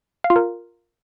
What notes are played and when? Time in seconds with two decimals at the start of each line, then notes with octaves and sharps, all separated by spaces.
0.24 F5
0.30 F4
0.36 A#4